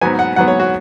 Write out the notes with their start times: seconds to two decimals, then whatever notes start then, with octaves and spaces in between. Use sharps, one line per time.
0.01 G#2 F#3 B3 G#5
0.19 F#5
0.36 G#2 F#3 B3 F#5
0.48 C#5
0.60 F#4